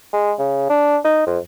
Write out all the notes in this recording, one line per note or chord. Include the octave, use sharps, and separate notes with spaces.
G#3
C#3
D4
D#4
F2